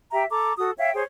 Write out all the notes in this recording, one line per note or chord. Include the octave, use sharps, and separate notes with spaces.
G4 E5 G5 A#5
A4 A#5 D6
F#4 A4 D#6
C#5 E5 F5 G5
G#4 C5 C#5